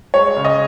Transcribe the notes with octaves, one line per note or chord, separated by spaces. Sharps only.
G#3 C#5
C#3
D#5